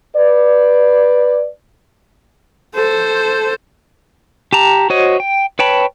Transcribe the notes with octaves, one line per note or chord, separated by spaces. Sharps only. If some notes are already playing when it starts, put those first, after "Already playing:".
B4 D5
A4 C5
G4 A5 A#5
F#4 C5 C#5 D#5
G5
B4 C#5 G5 A5 B5